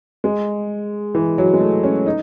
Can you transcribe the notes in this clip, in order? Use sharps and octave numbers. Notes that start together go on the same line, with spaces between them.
G#3
E3
F#3
G#3
A3
C#4
D#4